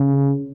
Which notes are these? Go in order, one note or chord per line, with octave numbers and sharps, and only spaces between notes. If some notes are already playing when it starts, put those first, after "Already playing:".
Already playing: C#3